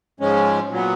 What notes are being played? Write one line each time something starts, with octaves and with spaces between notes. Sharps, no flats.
G#2 F3 G#3 C#4
A#2 F#3 B3